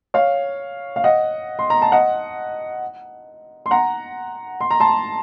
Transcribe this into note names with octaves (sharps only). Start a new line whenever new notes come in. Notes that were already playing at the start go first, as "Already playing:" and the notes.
C#5 F5
F5
D#5 F#5
C6
A#5
A5
D#5 F#5
C6
F#5 A#5
C6
A#5
A5 C6